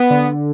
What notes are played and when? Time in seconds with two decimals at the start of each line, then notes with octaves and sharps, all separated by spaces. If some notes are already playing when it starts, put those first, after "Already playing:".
Already playing: B3
0.10 D3